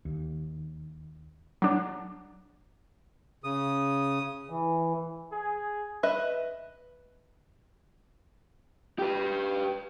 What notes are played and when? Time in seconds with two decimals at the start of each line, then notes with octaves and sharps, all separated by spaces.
0.05 D#2
1.62 F#3 D4
3.44 C#3 D#6
4.50 E3
5.32 G#4
6.03 B4 D#5 E5
8.99 G4 B4